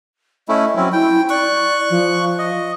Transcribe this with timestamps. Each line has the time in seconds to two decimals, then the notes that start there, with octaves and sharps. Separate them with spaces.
0.49 A3 C#4 E4 D#5
0.76 F#3 C4 C#4 E4
0.93 E4 G5
1.30 D5 C#6 F#6
1.90 F3
2.38 D#5